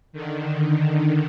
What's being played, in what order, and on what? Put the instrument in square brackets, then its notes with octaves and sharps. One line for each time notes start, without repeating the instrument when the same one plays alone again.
[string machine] D3 D#3